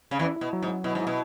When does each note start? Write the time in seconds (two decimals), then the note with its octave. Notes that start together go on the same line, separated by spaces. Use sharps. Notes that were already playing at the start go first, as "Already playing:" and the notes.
0.11 C#3
0.19 E2 E3 E4
0.36 E4
0.41 B2
0.53 F#3
0.63 G#2
0.68 F#3
0.84 B2 E4
0.95 G#2
1.01 E4
1.07 B2